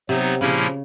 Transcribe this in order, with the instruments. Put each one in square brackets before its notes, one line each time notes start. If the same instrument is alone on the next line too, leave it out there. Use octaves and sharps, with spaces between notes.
[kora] C3 [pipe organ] F#3 B3 D#4
[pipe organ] A#2 F3 A#3 C#4 E4 [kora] C#3